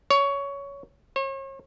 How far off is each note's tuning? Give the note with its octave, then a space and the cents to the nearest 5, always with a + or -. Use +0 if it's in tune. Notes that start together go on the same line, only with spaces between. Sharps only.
C#5 +15
C#5 -40